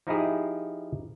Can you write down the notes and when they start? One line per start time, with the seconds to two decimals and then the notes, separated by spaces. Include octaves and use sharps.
0.07 F3 D#4 E4 G4 G#4